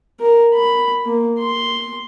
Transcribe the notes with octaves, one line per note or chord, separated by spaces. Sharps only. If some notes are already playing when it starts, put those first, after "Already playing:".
A#4
B5
A#3
C6